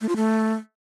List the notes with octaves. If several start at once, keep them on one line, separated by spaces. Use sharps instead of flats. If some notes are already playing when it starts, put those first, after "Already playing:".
A3
F4
A3